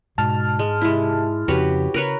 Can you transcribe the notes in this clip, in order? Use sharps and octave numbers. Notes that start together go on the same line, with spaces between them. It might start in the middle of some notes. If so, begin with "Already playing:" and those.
G#2 B2 A5 F6
G#3
C3 G#3 E4
F2 C#3 F#4 G4 B4 C#5
C#3 A#4 B4 C#5